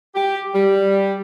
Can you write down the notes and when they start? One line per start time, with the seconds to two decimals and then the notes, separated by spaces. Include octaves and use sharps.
0.15 G4
0.55 G3